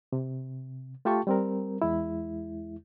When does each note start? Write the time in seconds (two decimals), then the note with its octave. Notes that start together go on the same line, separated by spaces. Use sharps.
0.13 C3
1.05 A3 F4 G4 G5 A5 C#6
1.27 G3 C4 A#4
1.82 E2 G#3 E4